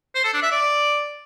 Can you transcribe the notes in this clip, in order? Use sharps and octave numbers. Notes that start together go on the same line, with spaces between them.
C5
A4
D4
E5
D5